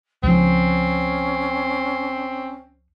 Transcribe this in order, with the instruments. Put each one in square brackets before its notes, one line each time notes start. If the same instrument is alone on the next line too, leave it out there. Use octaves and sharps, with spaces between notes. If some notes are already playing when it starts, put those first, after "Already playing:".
[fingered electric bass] C#2 F3 [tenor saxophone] C4 [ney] C#4